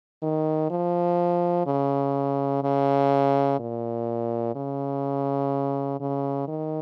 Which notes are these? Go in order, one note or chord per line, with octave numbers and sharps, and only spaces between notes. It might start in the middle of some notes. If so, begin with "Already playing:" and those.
D#3
F3
C#3
C#3
A#2
C#3
C#3
D#3